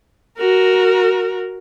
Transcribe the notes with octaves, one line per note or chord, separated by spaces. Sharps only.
F#4 A#4